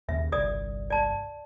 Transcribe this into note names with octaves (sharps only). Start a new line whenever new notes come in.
D#2 C#3 E5
G1 C2 D5 D#6
D5 A5